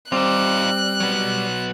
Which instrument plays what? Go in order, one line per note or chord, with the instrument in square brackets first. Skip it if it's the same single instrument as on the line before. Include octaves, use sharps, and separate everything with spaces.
[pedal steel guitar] G3 [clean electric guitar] C4 [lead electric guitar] D#4 F4 [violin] F#6
[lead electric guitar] F#3 B3